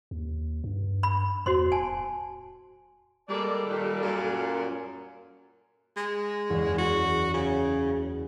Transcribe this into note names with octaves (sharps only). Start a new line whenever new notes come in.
D#2
G2
B5
E2 F#4 C5 C6
D1 G#5 A5
G3 G#3 A#3 A4 D5
A#2 D#3
F#2 A#2
G#3
F#1 E2 C#6
F#4
C#3